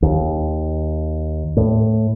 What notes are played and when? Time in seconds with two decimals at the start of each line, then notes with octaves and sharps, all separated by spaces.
0.02 D#2
1.57 A2